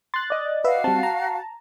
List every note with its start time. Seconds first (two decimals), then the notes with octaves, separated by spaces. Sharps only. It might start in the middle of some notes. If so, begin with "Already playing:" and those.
0.14 C6 F#6 A6
0.30 D5 D#5
0.64 F#4 B4 E5 F5
0.84 G3 C4 A5
1.03 A#5